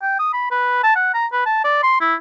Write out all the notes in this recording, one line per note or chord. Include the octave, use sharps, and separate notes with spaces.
G5
D#6
B5
B4
A5
F#5
A#5
B4
A5
D5
C6
E4